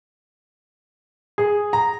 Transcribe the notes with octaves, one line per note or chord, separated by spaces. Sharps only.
G#4
A#5